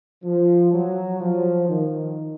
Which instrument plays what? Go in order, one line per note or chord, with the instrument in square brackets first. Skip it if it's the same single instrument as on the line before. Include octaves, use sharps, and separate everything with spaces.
[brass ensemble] F3
F#3
F3
D#3